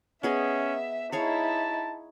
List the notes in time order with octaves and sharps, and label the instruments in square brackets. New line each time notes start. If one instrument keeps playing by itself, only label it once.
[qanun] B3 G#4 D#5 [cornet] C#4 [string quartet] E5
[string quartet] D#4 E4 [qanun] G#4 C#5 F5 [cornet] A5